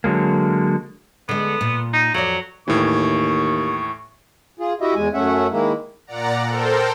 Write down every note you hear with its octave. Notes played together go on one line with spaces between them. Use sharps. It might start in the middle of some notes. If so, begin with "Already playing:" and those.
D3 F#3 G#3 A#3
D3 G#3 B3
A#2
D#4
F2 F#3 D5
D#2 A2 E3 C#6
F4 G#4
E4 F#4 G4 D#5 E5
E2 G#3 G#5
F#2 A3 C#4 E5 F#5
D#3 G#3 A#3 E4
A#2 D5 F#5 A#5
A4 A#4 C5 G5